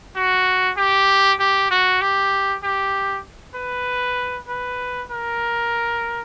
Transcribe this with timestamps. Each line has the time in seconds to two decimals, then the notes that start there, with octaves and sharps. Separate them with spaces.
0.16 F#4
0.77 G4
1.40 G4
1.71 F#4
2.01 G4
2.64 G4
3.55 B4
4.48 B4
5.11 A#4